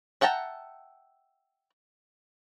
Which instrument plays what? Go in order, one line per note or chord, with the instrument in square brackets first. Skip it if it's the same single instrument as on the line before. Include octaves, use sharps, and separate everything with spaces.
[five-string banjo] E5 F#5 G5 A5 A#5